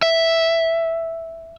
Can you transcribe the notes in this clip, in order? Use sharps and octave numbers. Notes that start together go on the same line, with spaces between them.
E5